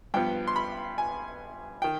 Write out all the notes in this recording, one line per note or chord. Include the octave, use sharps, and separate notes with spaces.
G2 F3 B3 G5
C6
B5
G#5
D#3 G5